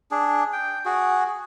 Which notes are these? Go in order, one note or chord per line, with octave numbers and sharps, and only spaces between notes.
D4 G#4
G5
F#4 G#4